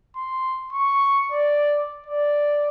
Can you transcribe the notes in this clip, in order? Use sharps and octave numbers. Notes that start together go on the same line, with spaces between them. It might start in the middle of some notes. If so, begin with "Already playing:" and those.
C6
C#6
D5
D5